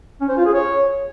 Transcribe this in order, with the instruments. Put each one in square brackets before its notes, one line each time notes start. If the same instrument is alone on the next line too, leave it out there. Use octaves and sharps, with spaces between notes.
[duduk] C#4
C5
F4
G#4
C#5